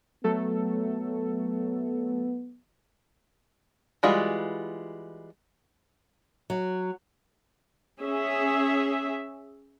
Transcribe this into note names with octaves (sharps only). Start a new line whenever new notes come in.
F#3 A3 B3 A4
E3 G3 G#3 F4 F#4
F#3
C#4 G#4 E5